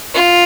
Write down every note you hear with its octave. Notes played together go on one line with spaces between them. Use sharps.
F4